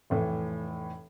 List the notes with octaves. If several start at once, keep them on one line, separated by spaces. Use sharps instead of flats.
F1 A2 E3